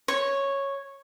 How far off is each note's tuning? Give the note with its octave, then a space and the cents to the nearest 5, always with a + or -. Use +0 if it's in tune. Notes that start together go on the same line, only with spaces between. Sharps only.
C#5 -5